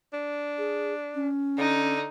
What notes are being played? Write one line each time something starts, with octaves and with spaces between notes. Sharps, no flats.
D4
G#4
C#4
D3 D#4